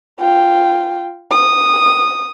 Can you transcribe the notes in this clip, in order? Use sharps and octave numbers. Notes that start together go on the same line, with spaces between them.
F4 G5
D#6